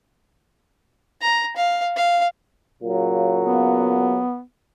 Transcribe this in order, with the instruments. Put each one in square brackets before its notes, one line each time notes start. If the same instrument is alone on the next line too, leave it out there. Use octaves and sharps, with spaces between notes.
[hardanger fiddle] A#5
F5
F5
[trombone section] A#2 C#3 F#3
[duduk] B3